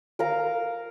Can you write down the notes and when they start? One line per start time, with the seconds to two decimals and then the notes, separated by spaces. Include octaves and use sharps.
0.19 A#4 F5 A#5